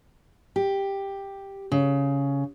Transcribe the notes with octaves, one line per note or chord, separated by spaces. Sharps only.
G4
C#3